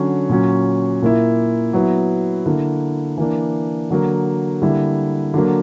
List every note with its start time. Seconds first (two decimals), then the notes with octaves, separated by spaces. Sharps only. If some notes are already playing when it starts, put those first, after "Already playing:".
Already playing: D3 F#3 C#4
0.29 A#2 F#3 C#4
1.02 A#2 A#3 E4
1.73 F#3 B3 E4
2.46 D3 A#3 E4
3.18 E3 A#3 D4
3.90 D3 F#3 A#3
4.62 D3 G3 A#3 E4
5.34 D3 F#3 A#3